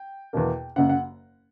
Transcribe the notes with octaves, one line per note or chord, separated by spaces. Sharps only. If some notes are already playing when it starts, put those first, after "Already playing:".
Already playing: G5
E2 B2 A#3
F#1 F#2 C#3 F#5
F#5